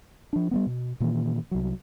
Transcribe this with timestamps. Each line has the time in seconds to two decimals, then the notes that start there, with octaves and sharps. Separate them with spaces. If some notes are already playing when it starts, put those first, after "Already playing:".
0.33 F3 D4
0.51 G3 G#3 B3
0.67 B2
1.00 A#2 D#3 E3 A#3
1.51 C2 F#3